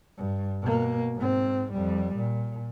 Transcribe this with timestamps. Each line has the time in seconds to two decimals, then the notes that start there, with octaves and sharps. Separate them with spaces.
0.18 G2
0.62 B2 A#3
1.16 G#2 C4
1.73 F2 G3
2.16 A#2